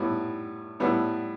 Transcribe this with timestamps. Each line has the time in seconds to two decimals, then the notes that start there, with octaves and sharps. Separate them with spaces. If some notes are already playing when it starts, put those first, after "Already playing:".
Already playing: A2 G3 B3
0.80 A2 G3 B3